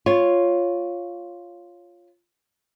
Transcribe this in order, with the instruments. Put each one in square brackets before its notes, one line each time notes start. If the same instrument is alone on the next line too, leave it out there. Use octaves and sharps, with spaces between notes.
[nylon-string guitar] F4 C#5